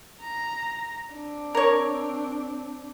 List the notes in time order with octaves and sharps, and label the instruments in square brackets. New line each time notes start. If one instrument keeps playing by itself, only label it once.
[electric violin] A#5
C4 D4
[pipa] A#4 C#5